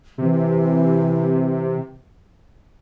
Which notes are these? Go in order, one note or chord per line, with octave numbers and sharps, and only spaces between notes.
C3 E3